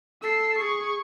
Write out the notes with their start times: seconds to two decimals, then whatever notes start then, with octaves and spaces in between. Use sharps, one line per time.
0.23 A4 E6 C7
0.59 G#4 C#6